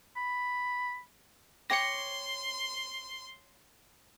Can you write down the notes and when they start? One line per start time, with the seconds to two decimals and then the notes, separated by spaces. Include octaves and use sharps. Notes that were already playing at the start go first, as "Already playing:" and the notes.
0.16 B5
1.70 C#5 G5 C6 D6 A#6 C#7